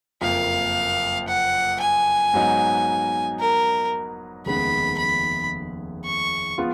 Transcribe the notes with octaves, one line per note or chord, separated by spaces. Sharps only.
F#1 F2 F3 A#3 F5
F#5
G#5
G#2 F#3 B3 D#4
A#4
F1 D#2 C#3 G#3 B3 B5
B5
C#6
F3 G#3 B3 F4